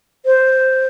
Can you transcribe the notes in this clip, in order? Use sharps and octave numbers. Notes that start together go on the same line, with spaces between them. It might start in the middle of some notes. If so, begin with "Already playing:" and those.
C5